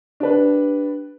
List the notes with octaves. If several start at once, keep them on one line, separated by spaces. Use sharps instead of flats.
D4 G4 B4